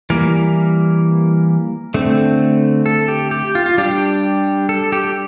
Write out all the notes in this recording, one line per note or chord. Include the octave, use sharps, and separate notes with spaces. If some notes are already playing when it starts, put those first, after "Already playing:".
E3 G3 A#3 A#4
D3 A3 C4
A4
G4
G4
F4
F4
G3 D4 G4
A4
G4